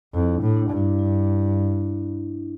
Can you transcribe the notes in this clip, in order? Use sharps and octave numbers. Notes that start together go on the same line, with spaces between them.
F2 E4
D4
A2
D4
G2
E4
E4